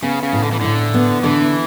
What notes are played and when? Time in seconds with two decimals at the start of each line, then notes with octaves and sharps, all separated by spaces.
0.02 C#3 B3
0.23 C#3
0.33 A2
0.43 D3
0.52 E3
0.61 A2 D3
0.94 B3
1.24 D3 E3